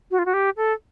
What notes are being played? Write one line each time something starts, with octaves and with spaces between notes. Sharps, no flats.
F#4
F4
F#4
G4
A4